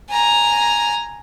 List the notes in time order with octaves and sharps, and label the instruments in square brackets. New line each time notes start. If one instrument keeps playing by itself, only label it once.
[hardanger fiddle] G#5 A#5